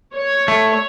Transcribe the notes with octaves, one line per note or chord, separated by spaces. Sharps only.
C#5
A3